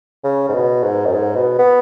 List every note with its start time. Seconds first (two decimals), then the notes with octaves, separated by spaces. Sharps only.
0.24 C#3
0.49 G#2
0.54 B2
0.83 G#2
1.06 F#2
1.13 G#2
1.36 B2
1.59 B3